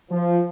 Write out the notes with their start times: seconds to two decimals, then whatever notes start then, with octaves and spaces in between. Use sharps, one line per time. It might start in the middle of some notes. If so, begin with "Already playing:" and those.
0.11 F3